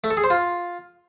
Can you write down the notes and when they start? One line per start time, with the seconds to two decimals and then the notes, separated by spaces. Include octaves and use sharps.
0.04 A3
0.10 A4
0.17 G#4
0.24 C5
0.30 F4